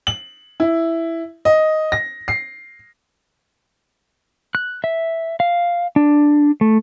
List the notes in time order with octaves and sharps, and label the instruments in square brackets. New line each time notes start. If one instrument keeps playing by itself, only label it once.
[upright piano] F#7
E4
D#5
A#6
C7
[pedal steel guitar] F#6
E5
F5
D4
A3